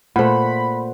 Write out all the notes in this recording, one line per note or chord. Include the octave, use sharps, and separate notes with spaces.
A#2 A3 C5 F#5 B5